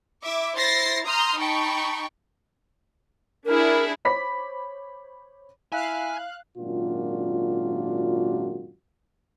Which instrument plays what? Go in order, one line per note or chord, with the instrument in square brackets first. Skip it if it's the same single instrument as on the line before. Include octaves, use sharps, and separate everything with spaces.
[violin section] E4 E5 D6
E4 C5 A6 A#6 C7
A#5 C6 D#6 F6 G6
D#4 G5 A5 B5 C#6
[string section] D4 E4 G#4 [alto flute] A#4
[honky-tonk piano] C5 C#5 B5 D6 B6
[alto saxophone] E4 [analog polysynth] F5 F#6 [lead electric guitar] G#5
[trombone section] G#1 F#2 A#2 D4 F4 F#4